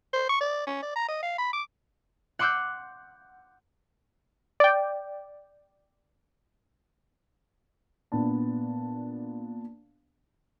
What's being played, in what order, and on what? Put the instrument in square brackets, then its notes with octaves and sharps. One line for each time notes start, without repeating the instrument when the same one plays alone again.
[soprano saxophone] C5
C#6
D5
C#4
D5
A#5
D#5
F5
B5
D6
[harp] F#5 C6 D6 E6 F#6 G6
[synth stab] D5 G5
[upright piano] A#2 B3 D4 A5